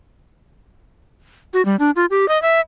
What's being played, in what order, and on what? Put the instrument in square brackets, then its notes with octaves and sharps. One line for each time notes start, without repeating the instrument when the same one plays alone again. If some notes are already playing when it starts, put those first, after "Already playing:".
[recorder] F#4
G3
D4
F4
G4
D#5
E5